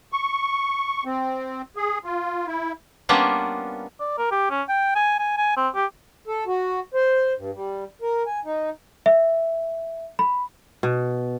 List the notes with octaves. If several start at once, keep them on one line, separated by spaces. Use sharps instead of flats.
C#6
C4
G#4
F4
E4
G3 A#3 B3 C#4 D4 F4
D5
A#4
G4
C#4
G5
G#5
G#5
G#5
C4
G4
A4
F#4
C5
G2
G3
A#4
G#5
D#4
E5
B5
B2